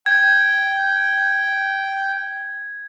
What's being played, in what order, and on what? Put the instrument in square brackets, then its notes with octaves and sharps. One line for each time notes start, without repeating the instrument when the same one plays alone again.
[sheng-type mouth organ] G5 [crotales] G#6